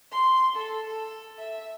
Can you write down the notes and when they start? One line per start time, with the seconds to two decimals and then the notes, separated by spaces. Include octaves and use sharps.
0.12 C6
0.56 A4
0.87 A4
1.38 E5